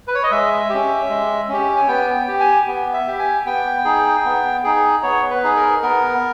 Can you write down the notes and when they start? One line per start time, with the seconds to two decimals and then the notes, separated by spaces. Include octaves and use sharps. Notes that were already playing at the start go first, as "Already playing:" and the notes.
0.07 B4
0.15 C#5
0.23 D#5
0.31 G#3 E5
0.70 C#4 G4
1.10 G#3
1.49 C#4 G4
1.77 G#5
1.88 B3 G5
2.14 G5
2.28 G4
2.40 G#5
2.67 B3
2.93 E5
3.07 G4
3.19 G#5
3.46 B3 G5
3.85 D#4 G#4
4.25 B3
4.64 D#4 G#4
5.03 B3 C#5
5.30 B4
5.43 D#4 G#4
5.56 A#4
5.82 B3 A#4